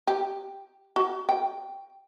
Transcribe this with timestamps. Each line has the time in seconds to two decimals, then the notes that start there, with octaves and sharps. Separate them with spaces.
0.07 G4
0.96 F#4
1.29 G5